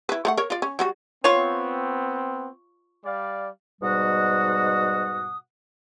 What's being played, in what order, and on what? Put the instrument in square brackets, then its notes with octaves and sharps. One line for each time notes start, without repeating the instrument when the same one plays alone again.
[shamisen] E4 B4
A3 C#5 F#5
A#4 C#5
F4 D5
C#4
F#3 G3 F#4
[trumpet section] B3 C4 [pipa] F4 C#5
[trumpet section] G3 D5 F5
[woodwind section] G#2 B2 G3 F#4 F#5 D#6